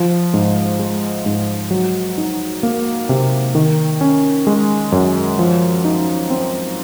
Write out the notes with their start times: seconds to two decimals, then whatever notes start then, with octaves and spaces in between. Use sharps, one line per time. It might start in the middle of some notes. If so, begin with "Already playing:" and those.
Already playing: F3
0.34 G#2
0.79 G#3
1.26 G#2
1.71 F#3
2.18 D#4
2.63 A#3
3.09 C3
3.55 D#3
4.01 C#4
4.47 G#3
4.92 F#2
5.39 F3
5.85 D#4
6.30 C4